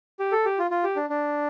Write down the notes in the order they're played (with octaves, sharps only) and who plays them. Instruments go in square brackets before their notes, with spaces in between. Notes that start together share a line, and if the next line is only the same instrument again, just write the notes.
[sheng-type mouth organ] G4
A4
G4
F4
F4
G4
D4
D4